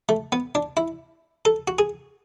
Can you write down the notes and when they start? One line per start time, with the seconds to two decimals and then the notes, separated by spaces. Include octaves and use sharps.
0.09 A3
0.32 B3
0.55 D4
0.77 E4
1.45 A4
1.68 F#4
1.79 G#4